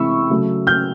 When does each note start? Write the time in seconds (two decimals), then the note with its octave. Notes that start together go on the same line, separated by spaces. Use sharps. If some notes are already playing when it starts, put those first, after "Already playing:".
Already playing: C3 E3 G#3 C4 E4 B5 C#6 E6
0.30 C#3 F#3 A3
0.67 F6 G6